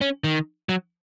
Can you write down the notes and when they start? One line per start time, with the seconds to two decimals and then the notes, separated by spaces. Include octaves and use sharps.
0.01 C#4
0.24 D#3
0.69 F#3